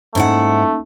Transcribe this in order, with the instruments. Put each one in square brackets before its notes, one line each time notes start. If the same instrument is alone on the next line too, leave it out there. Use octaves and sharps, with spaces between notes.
[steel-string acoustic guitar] G#2 E4 F#5 [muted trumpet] A3 [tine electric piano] A#3 C#4 D#4